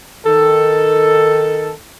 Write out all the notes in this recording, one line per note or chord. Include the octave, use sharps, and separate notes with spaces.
D#3 A4